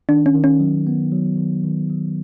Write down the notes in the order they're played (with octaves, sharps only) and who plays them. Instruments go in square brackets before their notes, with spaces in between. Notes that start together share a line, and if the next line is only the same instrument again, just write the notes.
[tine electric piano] D#3 [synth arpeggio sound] D4
[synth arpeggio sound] C#4
[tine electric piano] D#3
[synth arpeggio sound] C#4
[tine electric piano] F#3
B3
F#3
D#3
D#3
F#3